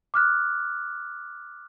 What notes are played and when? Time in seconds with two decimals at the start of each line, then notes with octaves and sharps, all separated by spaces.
0.14 D6 F6 F#6